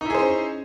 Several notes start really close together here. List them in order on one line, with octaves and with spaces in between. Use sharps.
D#4 E4 G#4 C5 C#4